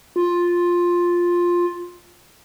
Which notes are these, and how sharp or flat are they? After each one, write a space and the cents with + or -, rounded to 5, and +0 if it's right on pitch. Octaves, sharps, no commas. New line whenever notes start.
F4 +5